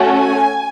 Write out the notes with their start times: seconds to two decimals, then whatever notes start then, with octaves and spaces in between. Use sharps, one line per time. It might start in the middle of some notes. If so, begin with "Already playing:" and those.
Already playing: A3 C#4 F#4 A4
0.16 G#5